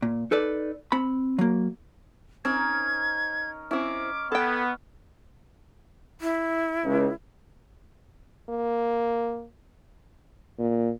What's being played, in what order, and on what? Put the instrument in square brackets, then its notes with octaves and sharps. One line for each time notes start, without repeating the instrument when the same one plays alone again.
[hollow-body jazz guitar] A#2
D#4 A4 B4 D5
C4 B5
F#3 A#3
[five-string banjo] C4 [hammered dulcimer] C#4 D#4 A#4 [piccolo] G#6
[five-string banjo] C4 E4 [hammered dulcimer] C#4 [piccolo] D6
[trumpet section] B3 [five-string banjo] A4 G5 [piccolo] G#6
[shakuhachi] E4
[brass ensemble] C#2
[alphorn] A#3
[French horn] A#2